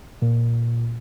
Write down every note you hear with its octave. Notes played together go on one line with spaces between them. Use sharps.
A#2